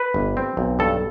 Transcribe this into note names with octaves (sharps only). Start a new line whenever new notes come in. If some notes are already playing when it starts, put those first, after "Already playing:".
Already playing: B4
G1
C4
B1
G2 A4